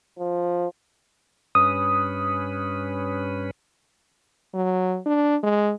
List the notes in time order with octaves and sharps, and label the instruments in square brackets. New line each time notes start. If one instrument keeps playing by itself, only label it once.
[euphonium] F3
[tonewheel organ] G2 C#4 B4 [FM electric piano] D#6
[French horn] F#3
D4
G#3